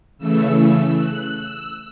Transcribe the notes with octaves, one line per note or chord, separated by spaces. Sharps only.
C#3 E3 A3 E6
F#6
E6